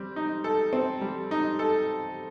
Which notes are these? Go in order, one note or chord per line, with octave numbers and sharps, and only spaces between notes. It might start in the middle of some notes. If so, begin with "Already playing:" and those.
Already playing: G3 C4
D#4
A4
C4
G3
D#4
A4